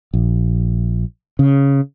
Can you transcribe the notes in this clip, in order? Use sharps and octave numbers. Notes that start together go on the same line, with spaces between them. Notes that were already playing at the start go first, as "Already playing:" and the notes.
A#1
C#3